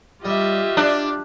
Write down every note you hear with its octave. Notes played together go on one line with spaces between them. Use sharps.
G3 F4 G4 D#5 E5
D4 D5 C6